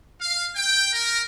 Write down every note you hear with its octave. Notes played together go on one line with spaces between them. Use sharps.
F5
G5
A#4